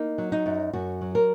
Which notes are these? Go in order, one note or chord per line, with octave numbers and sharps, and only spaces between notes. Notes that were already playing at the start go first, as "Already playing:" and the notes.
Already playing: A#3 D#4
F#3
D#4
F#2
F#2 F#4
F#3
A#4